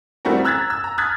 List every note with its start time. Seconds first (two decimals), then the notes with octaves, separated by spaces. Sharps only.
0.25 E3 G3 A3 C4 F#4 A#4
0.45 A#5 E6 F#6 G#6 A6 B6
0.70 E6
0.84 A#5
0.98 D#6 F6 F#6 G#6 A6 B6